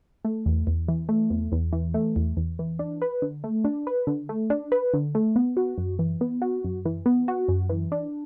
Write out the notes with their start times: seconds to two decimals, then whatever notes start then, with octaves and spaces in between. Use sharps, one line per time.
0.25 A3
0.46 E2
0.67 E2
0.88 E3
1.09 A3
1.30 E2
1.52 E2
1.73 E3
1.94 A3
2.16 E2
2.37 E2
2.59 E3
2.79 D4
3.02 B4
3.22 D3
3.44 A3
3.64 D4
3.87 B4
4.07 D3
4.29 A3
4.50 D4
4.72 B4
4.94 D3
5.15 A3
5.36 B3
5.57 F#4
5.78 F#2
5.99 E3
6.21 B3
6.42 F#4
6.64 F#2
6.85 E3
7.06 B3
7.28 F#4
7.48 F#2
7.70 E3
7.92 D4